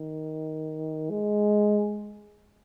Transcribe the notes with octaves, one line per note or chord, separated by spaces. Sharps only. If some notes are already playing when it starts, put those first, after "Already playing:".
Already playing: D#3
G#3